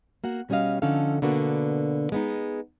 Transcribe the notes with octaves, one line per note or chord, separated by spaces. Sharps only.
A#3 F#4 F#5
B2 G3 C#4 F#4 D#5 F5
D3 F3 C#4 D#4 A4 F5
B2 D3 A#3 B3 D4 F#4
G#3 B3 D#4